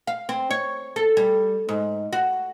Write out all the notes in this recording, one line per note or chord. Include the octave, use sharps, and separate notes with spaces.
F5
C4
C#5
A4
G3
G#2
F#4